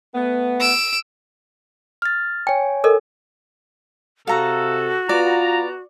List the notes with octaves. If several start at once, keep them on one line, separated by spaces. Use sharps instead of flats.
A3 B3
E6 D7
F6 A6
C#5 G5 G#5
A4 A#4 D#5
C3 F#4 A4 F5 A#5
B3 F4 D5 A#5